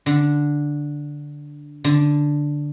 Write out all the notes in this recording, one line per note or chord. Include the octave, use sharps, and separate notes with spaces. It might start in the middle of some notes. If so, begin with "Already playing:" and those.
D3
D3